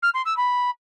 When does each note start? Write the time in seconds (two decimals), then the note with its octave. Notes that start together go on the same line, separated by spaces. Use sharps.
0.02 F6
0.14 C6
0.25 E6
0.37 B5